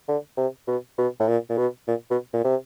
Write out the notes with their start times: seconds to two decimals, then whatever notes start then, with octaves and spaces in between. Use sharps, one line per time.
0.08 D3
0.38 C3
0.67 B2
0.98 B2
1.20 A2
1.28 A#2
1.50 A#2
1.58 B2
1.88 A#2
2.10 B2
2.33 A#2
2.44 C3